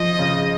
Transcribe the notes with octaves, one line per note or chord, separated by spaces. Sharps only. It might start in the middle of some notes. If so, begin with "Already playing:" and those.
Already playing: F3 D#5
C#3